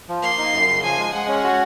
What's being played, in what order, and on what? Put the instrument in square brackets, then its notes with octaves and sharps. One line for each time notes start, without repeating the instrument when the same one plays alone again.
[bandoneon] F3
[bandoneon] A#3 [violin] C6
[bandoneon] D#4
F#2
C#3
[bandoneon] F3 [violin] G#5
[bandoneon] G#3
[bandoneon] G#3 [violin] F#5
[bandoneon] C#4
F#4